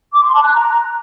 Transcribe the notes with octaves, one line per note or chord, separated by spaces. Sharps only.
D6
C6
A5
F#6
A#5